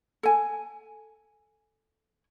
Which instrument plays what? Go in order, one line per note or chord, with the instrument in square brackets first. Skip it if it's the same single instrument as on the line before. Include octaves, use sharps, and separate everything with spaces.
[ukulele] A4 G#5